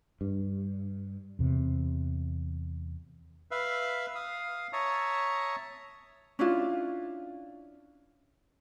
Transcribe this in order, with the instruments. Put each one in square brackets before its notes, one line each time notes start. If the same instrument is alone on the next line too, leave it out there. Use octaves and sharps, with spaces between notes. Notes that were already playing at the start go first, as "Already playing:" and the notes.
[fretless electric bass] G2
E2 C3
[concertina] B4 E5 F5
F5 D#6
C#5 E5 A5 A#5 C#6 D#6
[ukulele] C#4 D4 E4 F4